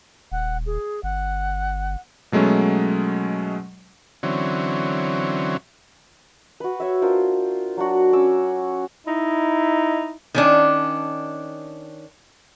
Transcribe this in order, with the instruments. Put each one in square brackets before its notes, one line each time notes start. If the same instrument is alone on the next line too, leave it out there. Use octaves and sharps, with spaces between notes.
[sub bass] D#1 [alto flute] F#5
[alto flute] G#4
[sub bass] G1 [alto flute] F#5
[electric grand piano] B2 F#3 G#3 A3 C#4
[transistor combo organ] D3 E3 F#3 C4 C#4
[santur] F#4 B4
C#5 E5
D4 F4 A#4 C5
F#3 D4 F#4
C#4 D6 E6
[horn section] D#4 E4
[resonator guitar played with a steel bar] D#3 C#4 D4